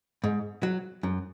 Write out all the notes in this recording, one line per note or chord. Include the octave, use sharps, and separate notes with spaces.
G#2
F#3
F#2